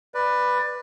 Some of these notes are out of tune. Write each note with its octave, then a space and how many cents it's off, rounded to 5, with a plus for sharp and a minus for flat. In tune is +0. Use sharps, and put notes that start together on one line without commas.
B4 +0 D5 +15